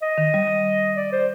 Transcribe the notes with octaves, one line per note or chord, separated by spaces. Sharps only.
D#5
D#3
G3
D5
C5